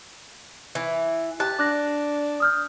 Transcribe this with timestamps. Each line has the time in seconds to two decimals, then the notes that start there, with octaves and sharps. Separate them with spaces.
0.75 E3
1.40 G4 A5 F#6
1.59 D4 D6 F#6 A#6
2.40 D#6 F6 G6